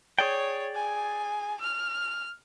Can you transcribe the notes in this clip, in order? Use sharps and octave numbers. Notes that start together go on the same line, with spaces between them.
G#4 C#5 D5 G5
G#5
F6